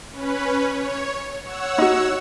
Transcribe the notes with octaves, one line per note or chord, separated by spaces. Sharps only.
C#4 B4
C#5
C#5 F#5 E6
D#4 F#4